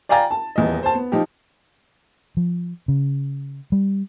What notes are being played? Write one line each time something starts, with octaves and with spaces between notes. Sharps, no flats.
D5 F5 G5 G#5 A#5 A6
A5
D#1 E2 D#5
C5 A5
B3
F3 D#4 G4
F3
C#3
G3